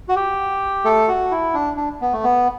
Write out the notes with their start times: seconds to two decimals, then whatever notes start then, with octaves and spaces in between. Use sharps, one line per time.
0.09 F#4
0.16 G4
0.85 A3 A4
1.08 F#4
1.31 E4
1.54 D4
1.77 D4
2.01 B3
2.13 A3
2.23 B3